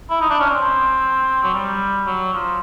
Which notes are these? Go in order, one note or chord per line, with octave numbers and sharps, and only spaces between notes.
E4
D#4
D4
C#4
C4
F#3
G3
F#3
F3